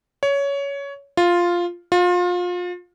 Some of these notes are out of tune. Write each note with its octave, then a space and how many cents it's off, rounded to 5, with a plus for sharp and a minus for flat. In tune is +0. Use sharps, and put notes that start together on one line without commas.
C#5 +15
F4 +0
F4 +30